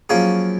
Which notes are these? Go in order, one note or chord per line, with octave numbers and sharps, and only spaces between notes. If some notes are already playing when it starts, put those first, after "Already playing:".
F#2 F3 A#3 C#4 G#4